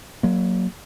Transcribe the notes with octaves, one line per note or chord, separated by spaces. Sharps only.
F#3 A#3